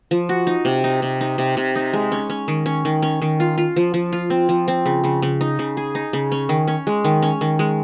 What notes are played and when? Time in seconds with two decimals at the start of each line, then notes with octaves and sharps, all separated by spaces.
0.11 F3
0.29 F#4
0.47 D#4
0.65 C3
0.84 D#4
1.02 C3
1.21 D#4
1.38 C3
1.57 C3
1.76 D#4
1.93 G#3
2.12 C#4
2.30 C#4
2.48 D#3
2.66 C#4
2.85 D#3
3.02 C#4
3.22 D#3
3.40 F4
3.58 F4
3.76 F3
3.94 F3
4.13 F4
4.30 C4
4.49 F3
4.68 C4
4.86 C#3
5.04 C#3
5.22 C#3
5.41 D#4
5.59 C#3
5.77 G#4
5.95 D#4
6.13 C#3
6.32 C#4
6.49 D#3
6.68 C#4
6.87 G#3
7.05 D#3
7.22 C#4
7.41 D#3
7.59 G#3